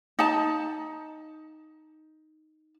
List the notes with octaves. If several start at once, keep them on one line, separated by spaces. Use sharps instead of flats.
D#4 A5